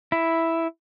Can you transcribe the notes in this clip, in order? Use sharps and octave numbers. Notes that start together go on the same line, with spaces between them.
E4